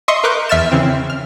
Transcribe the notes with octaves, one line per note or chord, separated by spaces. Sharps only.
D#5 E5 C6 C#6 D#6 C7
A#4 B4 D6 F#6 G6
E2 E5 F6 A6 E7
C#3 E3 C4
F6